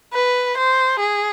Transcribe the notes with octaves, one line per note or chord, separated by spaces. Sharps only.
B4
C5
G#4